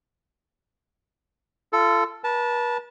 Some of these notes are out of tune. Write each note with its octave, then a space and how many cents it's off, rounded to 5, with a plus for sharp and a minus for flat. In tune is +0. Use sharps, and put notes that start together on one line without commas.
F4 -30 A4 +0
B4 -40 A5 -5